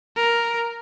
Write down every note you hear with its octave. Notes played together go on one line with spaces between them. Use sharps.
A#4